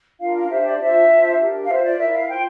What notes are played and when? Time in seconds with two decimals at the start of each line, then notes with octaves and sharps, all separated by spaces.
0.19 D4 F4 A#4 F5
0.34 F5
0.49 D4 G4 C5 E5
0.65 D5
0.79 D4 F4 C5 E5
1.09 D4 F4 C5
1.39 D4 G4 A#4
1.65 F5
1.68 F4 C5 E5
1.83 D5
1.98 E4 A#4 E5
2.13 F5
2.27 F4 C5 G5